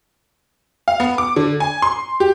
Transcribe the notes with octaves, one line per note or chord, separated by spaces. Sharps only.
F5
B3
D6
D3
G#5
C6
G4